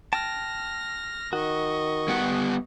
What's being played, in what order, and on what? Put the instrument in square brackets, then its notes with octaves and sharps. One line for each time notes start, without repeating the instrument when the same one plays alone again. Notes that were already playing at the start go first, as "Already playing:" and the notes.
[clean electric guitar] G5 A5 [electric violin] F6 A#6
[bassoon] D#3 [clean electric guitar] F#4 [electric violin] D#5 C#6
[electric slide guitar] G3 B3 F#5